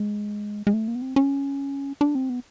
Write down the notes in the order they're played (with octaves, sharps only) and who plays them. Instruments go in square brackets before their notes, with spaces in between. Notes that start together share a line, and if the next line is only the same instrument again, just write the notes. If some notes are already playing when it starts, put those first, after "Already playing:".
Already playing: [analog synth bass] G#3
G#3
A3
A#3
B3
C4
C#4
D4
C4
B3